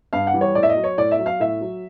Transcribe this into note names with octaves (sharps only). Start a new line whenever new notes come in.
G2 F5
F#5
E3 G3
C#5
A2 D5
E5
D#5
F#3
C#5
A2 D5
E5
F#3
F5
A2 E5
F#3